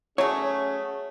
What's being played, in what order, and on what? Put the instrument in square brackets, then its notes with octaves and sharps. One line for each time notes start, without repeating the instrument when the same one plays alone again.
[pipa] F#3 A3 [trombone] C#4 [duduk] G#4 [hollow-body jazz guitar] C#5